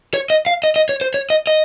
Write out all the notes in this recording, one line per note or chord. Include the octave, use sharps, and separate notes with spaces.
C#5
D#5
F5
D#5
D#5
C#5
C5
C#5
D#5
D#5